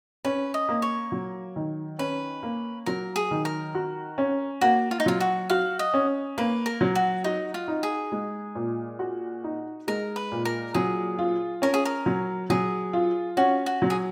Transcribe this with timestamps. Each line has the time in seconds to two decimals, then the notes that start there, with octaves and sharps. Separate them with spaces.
0.25 C#4 B4
0.54 D#5
0.69 A#3
0.82 C#5
1.12 F#3
1.56 D#3
1.99 C#4 B4
2.43 A#3
2.86 F#3 A#4
3.16 G#4
3.31 D#3
3.45 A#4
3.75 F#4
4.18 C#4
4.61 A#3 F#4
4.91 F4
5.00 D#4
5.06 F#3 F4
5.20 F#4
5.50 F#4 F5
5.79 D#5
5.94 C#4
6.38 A#3 B4
6.66 A#4
6.81 F#3
6.95 F#4
7.24 D#4 F#4
7.54 F4
7.68 D#4
7.83 G#4
8.12 G#3
8.55 A#2
8.99 F#4
9.44 D#4
9.88 G#3 A#4
10.16 B4
10.32 A#2
10.45 A#4
10.74 F#3 G#4
11.19 F4
11.62 C#4 A#4
11.74 G#4
11.85 A#4
12.06 F#3
12.50 F#3 G#4
12.93 F4
13.37 C#4 F#4
13.66 F#4
13.82 F#3
13.90 G#4